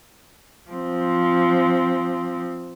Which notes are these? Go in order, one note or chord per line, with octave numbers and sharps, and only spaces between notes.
F3 C4